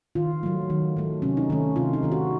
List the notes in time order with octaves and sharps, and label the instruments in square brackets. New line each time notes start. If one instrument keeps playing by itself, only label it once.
[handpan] D#3 F4
F#3 A3
D#3
F#3 A3
C3 C#4
D#4
D#3 A3 C#4
C3 F4
D#4
D#3 A3
F#4